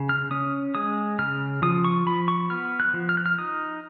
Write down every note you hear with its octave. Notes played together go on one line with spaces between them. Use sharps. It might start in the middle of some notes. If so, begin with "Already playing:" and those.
Already playing: C#3
F6
C#4 D#6
G#3 D#6
C#3 F6
F3 D#6
C#6
F3 B5
C#6
B3 F6
F#6
F3
F6
F#6
F6
D#4 D#6